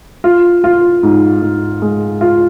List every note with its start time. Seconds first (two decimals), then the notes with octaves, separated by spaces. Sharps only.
0.24 F4
0.64 F4
1.03 G#2
1.42 G#2
1.82 G#3
2.21 F4